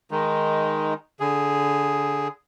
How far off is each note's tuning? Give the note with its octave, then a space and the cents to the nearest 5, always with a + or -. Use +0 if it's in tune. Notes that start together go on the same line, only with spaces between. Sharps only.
D#3 +0 G#3 +5 D#4 +0
D3 -15 G#4 +0